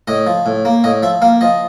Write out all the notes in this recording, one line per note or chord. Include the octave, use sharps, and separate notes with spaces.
A2 D#5
F3
A2
A#3
A2 D#5
F3 E5
A#3 F5
F3 D#5